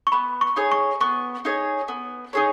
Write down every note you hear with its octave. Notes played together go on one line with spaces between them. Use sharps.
C#6
B3 B5
C#6
D#4 G#4 C#5
C#6
B3 C#6
D#4 G#4 C#5
B3
D#4 G#4 C#5